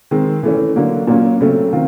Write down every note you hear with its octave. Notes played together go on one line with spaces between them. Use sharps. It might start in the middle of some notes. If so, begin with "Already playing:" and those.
D#3 G#3 C4
E3 A3 C#4
D3 F#3 A#3
A#2 F#3 A#3 C#4
C#3 F#3 A3 C4
D#3 C4 F4